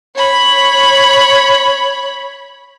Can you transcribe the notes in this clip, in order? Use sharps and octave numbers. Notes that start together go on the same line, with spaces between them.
C#5 B5